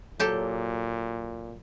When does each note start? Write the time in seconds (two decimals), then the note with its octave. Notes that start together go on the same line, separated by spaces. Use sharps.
0.20 A#2 F#3 G4 A4